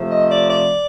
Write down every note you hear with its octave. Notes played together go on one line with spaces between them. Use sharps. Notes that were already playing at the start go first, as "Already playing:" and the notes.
Already playing: C3 F3 A3
D#5
D5
D5